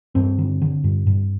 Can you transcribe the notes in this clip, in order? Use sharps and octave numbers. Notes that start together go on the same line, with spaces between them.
G2 C4
D3
D3
G2
G2